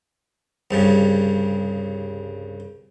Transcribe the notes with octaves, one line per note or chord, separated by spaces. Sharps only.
C2 G2 C#3